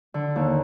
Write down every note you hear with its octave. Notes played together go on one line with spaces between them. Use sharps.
D3
D#2